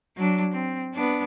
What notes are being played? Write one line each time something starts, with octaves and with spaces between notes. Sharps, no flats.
F#3 D4
C4
B3 D4